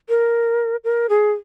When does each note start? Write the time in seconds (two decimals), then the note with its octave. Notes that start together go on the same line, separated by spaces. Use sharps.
0.09 A#4
0.84 A#4
1.09 G#4